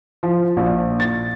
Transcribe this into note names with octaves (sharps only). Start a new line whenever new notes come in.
F3
A#1
A6